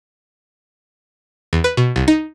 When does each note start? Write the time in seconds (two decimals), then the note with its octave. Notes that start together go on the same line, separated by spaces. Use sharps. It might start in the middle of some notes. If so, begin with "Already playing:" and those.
1.53 E2
1.64 B4
1.77 B2
1.96 C2
2.08 D#4